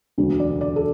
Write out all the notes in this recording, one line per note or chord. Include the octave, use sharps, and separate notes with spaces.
E1 D2 D3 F#3
D5
D5
A4